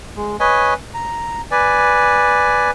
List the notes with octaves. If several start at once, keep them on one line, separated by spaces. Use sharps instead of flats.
G#3
B4 C#5 D#5 G#5
A#5
B4 D5 G#5